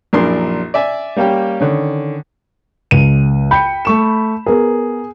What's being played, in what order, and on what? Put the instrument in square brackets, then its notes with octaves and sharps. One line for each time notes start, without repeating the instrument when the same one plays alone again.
[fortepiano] A#1 F#2 D4 E4 A#4 C6
D5 E5 G#5
G3 A#3 C#4 G4 G5
D3 D#3 C#4
[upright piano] C#2 D#7
[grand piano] G5 G6 [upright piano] B5 C#7
[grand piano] A3 C#6 E7
[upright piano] B3 A#4 [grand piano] G#4